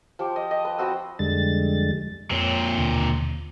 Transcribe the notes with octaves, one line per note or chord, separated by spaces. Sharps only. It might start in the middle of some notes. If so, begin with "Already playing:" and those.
F3 G4
D#5
D#5
B4
C4 F#4 A5 B5
F2 D3 G3 G#3 A6
F2 A#2 C4 C#5 C7
D#2 B2 D3